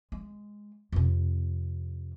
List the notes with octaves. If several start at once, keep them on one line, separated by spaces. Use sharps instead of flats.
G#3
F2 C3